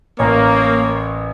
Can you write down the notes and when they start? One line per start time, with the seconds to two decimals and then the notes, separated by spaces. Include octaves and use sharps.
0.19 A1 A#3 C#5